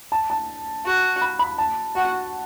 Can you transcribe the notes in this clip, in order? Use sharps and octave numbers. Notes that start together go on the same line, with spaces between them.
A5
A5
F#4
B5
B5
A5
F#4 F#5